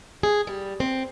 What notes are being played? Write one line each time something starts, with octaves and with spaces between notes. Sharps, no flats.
G#4
G3
C4